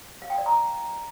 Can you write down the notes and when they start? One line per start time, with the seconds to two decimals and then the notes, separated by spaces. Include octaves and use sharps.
0.22 F5
0.30 G5
0.38 D5
0.46 A#5